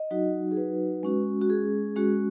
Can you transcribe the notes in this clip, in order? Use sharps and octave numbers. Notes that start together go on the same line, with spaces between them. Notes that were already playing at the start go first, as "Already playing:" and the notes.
Already playing: D#5
F#3 D#4 F#4
G#4
B4
G#3 C#4 F#4
F#4
G#4
G#3 C#4 F#4